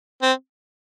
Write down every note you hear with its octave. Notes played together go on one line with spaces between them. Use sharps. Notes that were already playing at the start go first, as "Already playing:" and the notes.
C4